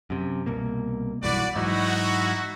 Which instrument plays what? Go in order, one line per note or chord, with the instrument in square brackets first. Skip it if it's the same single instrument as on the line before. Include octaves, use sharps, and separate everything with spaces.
[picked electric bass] F#2 C3
C2 B2 A#3
[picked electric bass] B1 G2 E3 [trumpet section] F#4 B4 D5
[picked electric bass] G#2 E3 F#3 [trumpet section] D#4 E4 F#4